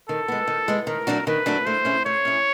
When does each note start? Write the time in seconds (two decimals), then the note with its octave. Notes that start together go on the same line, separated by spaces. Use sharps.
0.09 D#3 A4
0.28 G#3 B3
0.48 D#3
0.68 G#3 B3
0.87 D#3 A#4
1.07 F#3 A3 D4 F#4
1.27 D#3 B4
1.46 F#3 A3 D4 F#4
1.66 A3 C5
1.85 C#4 E4 G#4
2.05 A3 C#5
2.25 C#4 E4 G#4